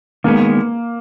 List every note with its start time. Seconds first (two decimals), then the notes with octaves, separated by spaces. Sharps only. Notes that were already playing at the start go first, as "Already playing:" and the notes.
0.24 D#3 G#3 A#3 B3